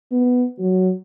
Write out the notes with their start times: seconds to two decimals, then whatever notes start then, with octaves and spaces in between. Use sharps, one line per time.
0.12 B3
0.58 F#3